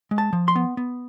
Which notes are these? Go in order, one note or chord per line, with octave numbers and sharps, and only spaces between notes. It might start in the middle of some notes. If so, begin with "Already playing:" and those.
G#3
A5
F3
C6
B3
B3